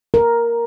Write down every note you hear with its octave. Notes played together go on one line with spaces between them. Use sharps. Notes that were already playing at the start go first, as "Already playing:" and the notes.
A#4